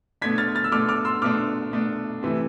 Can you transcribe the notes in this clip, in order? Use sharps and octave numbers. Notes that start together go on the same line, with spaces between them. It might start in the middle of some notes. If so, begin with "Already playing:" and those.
B2 A3 D4 G#6 B6
F6 A6
F6 A6
E6
B2 A3 D4 D6 F6
D6 F6
C6 E6
B2 A3 D4 D6 F6
B2 A3 D4
C3 E3 A3